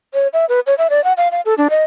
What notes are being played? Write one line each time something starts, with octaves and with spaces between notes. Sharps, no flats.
C#5
E5
B4
C#5
E5
D5
F#5
F5
F5
A4
D4
D#5